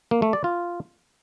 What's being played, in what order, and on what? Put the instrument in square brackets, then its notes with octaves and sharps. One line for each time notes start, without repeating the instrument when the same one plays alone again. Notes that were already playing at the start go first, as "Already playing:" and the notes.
[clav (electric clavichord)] A#3
A3
D5
F4